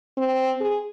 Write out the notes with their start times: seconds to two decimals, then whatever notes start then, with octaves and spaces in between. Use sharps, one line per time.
0.17 C4
0.61 G#4